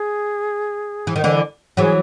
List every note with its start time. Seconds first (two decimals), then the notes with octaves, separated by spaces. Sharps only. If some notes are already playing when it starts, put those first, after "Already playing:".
Already playing: G#4
1.07 E3
1.16 D#3
1.24 D3 E3
1.77 E3 F#3 G#4